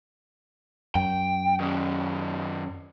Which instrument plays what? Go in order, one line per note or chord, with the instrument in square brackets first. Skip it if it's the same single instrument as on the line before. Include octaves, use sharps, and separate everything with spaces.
[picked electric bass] F#2 [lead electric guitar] G5
[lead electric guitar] D#3 C#4